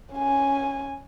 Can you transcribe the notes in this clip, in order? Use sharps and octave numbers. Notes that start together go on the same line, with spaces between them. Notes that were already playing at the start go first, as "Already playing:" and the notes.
C#4 G#5